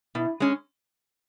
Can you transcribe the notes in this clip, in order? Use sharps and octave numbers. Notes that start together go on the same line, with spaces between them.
B2 E4
G#3 C#4